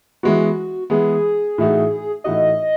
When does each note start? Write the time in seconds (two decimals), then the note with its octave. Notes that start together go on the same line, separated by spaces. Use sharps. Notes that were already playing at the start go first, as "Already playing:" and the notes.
0.23 E3 G#3 B3 F#4
0.90 E3 G#3 B3 G#4
1.58 A2 E3 A3 D#4 F#4
2.24 A2 E3 A3 D#4 F#4 D#5